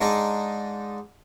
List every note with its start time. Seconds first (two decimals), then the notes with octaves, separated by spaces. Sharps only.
0.01 G#2 G#3 D4 D#4